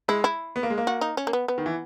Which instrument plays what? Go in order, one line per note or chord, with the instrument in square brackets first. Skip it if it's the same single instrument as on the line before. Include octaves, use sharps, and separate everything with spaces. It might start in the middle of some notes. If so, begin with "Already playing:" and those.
[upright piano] G#3 [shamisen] E4
[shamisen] E4
[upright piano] B3
A#3
G#3
A#3
[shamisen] F#4
D#4
C#4
A#3
B3
B3
[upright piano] D#3
E3